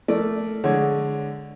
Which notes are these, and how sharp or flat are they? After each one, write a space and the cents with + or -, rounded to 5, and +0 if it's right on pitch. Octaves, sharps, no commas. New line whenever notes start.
A3 -5 A#4 -15 D5 -5
D3 +0 G#3 +15 C#5 +0